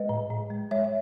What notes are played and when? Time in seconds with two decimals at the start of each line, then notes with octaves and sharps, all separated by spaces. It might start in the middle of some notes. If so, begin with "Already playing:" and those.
Already playing: G#3 B4 D#5
0.09 A2
0.30 A2
0.51 G#3
0.71 G#3 C#5 E5
0.84 E5